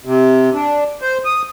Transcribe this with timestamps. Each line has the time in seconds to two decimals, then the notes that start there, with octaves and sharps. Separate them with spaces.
0.05 C3
0.54 D4
1.02 C5
1.25 D#6